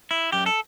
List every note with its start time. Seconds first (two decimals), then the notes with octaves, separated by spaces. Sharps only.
0.11 E4
0.32 F#2 G4
0.46 A4